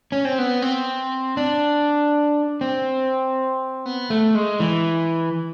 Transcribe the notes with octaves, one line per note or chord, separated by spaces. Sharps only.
C#4
C4
B3
C4
D4
C4
B3
A3
G#3
E3